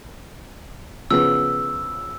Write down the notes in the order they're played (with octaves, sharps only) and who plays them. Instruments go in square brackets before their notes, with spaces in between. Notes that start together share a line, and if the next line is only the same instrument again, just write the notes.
[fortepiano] C#3 F3 B3 [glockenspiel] E6